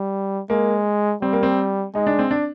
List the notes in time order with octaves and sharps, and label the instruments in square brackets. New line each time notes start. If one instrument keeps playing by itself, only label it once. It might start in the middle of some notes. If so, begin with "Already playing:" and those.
Already playing: [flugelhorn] G3
[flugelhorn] G#3 [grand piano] A#3
[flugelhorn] G3 [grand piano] C4
[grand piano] A#3
C4
[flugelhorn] G#3 [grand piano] D#4
[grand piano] D4
C4
D4